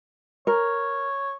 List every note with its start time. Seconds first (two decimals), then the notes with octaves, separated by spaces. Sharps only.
0.47 A#4 C#5